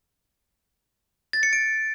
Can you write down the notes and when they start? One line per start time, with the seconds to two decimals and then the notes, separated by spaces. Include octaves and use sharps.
1.33 A6
1.43 C#7
1.53 D7